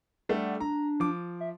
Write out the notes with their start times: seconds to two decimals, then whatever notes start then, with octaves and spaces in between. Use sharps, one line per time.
0.29 G3 A3 D4 F#5
0.60 D4 A#5
1.00 F3 D6
1.40 E5